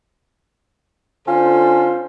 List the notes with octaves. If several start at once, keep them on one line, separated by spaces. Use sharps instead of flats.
D3 C#4 F4 A4 C5